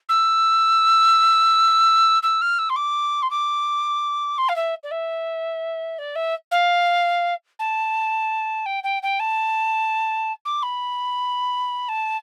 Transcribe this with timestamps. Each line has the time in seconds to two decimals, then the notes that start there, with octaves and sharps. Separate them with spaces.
0.09 E6
2.23 E6
2.41 F6
2.59 E6
2.70 C6
2.76 D6
3.22 C6
3.31 D6
4.38 C6
4.49 F5
4.56 E5
4.84 D5
4.91 E5
5.99 D5
6.16 E5
6.51 F5
7.59 A5
8.66 G5
8.84 G5
9.03 G5
9.20 A5
10.45 D6
10.63 B5
11.89 A5